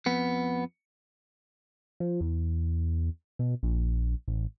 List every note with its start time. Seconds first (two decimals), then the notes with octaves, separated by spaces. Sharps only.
0.06 F2 B3
2.00 F3
2.21 E2
3.39 B2
3.63 A#1
4.28 A1